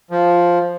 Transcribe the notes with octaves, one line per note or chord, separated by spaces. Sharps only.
F3